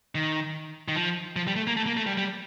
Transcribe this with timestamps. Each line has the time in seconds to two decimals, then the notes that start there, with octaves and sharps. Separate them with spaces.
0.15 D#3
0.88 D#3
0.96 F3
1.36 F3
1.47 G3
1.56 A3
1.67 A#3
1.77 A3
1.87 A#3
1.97 A3
2.07 G3
2.17 G3